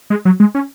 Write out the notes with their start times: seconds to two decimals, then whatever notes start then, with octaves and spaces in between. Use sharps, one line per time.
0.10 G#3
0.25 F#3
0.40 G#3
0.55 C#4